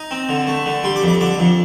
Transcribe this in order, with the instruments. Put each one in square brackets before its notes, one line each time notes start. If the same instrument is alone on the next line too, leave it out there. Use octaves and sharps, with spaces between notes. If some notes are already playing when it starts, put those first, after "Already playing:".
Already playing: [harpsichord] D#4
C4
D3
A3
D3
G3 C6
D6
F2
D6
D3 D6
F2